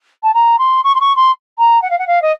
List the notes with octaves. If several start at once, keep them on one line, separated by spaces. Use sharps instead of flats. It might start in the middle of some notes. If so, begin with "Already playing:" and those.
A5
A#5
C6
C#6
C6
C#6
C6
A#5
F#5
F5
F#5
F5
D#5